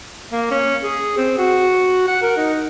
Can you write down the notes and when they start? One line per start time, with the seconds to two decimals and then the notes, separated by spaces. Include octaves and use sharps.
0.31 A#3
0.51 C#4
0.83 G#4
1.17 C4
1.38 F#4
2.07 F#5
2.22 A#4
2.37 D#4